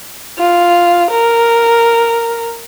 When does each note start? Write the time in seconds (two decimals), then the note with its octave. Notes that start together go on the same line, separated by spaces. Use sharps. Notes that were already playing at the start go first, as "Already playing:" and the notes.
0.38 F4
1.11 A#4